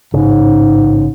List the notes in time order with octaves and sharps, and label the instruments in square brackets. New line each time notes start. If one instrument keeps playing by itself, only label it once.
[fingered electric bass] A1 C#3 [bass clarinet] G#2